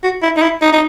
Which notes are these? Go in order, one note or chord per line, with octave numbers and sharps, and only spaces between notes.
F#4
E4
D#4
E4
D#4
D#4